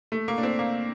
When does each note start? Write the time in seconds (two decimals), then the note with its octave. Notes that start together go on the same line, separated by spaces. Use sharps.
0.12 A3
0.28 A#3
0.38 D4
0.43 C4
0.59 A#3